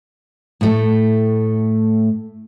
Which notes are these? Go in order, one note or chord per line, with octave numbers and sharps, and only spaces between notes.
A2 A3